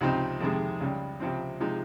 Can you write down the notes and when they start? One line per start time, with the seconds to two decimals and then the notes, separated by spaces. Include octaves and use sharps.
0.01 C#2 C3 F3 C4 D#4
0.41 F2 C3 D#3 G#3
0.81 C#2 C#3 G3
1.20 C#2 C3 F3 C4
1.60 C3 F3 G#3 D#4